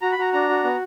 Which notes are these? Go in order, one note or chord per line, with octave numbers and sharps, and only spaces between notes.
F#4 A#5
B5
F#4 A#5
D4 A#5
F#4
B3